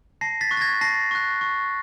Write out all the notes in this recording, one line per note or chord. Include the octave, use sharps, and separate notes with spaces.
A5 A#6 C7
A6 B6
C#6 F#6
A6
G#6 A#6
A5 A#6 C7
C#6 F#6
C#6